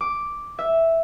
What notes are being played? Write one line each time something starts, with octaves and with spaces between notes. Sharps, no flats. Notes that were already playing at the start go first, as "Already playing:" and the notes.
D6
E5